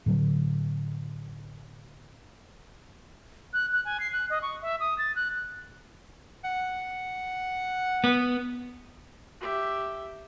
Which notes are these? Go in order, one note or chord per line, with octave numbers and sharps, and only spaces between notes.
A2 D3 F#3
F#6
F#6
G#5
C7
F#6
D#5
C#6
E5
D#6
A6
F#6
F#5
B3
G4 E5